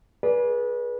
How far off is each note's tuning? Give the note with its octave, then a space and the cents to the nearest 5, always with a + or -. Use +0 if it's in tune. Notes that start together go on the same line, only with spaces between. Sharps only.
G#4 +10 B4 -30 D5 -15